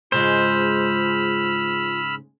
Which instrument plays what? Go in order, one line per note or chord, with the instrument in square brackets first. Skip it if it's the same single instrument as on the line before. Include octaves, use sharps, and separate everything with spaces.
[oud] G#2 C#3 G#3 [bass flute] F4 [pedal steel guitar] C5 [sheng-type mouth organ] B5 E6 F6